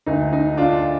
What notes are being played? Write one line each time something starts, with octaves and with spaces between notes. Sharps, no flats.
D2 D3 D#4
D#4
D4 F4